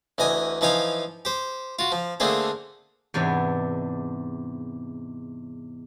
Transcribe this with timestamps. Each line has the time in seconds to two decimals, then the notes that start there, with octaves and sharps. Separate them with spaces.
0.18 D2 E3 D#5 G#5
0.61 E3 F3 D#4 F5 G#5
1.25 G4 C5
1.79 F4 F#4
1.92 F3
2.20 D3 A3 A#3 C4 G#4
3.14 E2 G#2 C3 D4